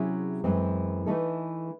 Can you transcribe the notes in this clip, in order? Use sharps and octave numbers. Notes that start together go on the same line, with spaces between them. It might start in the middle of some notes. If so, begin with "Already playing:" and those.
Already playing: C3 F#3 C#4 E4 G#4
F#2 E3 G#3 C4
E3 A3 D#4 A4